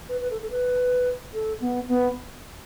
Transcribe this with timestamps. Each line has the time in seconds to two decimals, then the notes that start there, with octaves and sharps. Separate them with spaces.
0.08 B4
0.20 B4
0.30 A4
0.41 A4
0.50 B4
1.33 A4
1.60 B3
1.88 B3